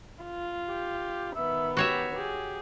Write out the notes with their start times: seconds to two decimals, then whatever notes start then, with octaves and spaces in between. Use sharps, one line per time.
0.24 F4
0.69 G4
1.35 D#3 B3 E5
1.77 F#4 G4 C#5 E5
2.15 G4 G#4